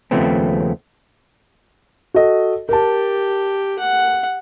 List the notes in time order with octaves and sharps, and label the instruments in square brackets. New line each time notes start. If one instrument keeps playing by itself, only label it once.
[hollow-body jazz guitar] D#2 C#3 F3 A3 B3 C4
[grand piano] F#4 A4 D#5
[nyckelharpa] G4 [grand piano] A#4 A5
[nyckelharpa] F#5